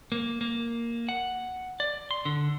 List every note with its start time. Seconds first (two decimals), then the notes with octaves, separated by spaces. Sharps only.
0.12 A#3
0.41 A#3
1.09 F#5
1.80 D5
2.11 C6
2.25 D3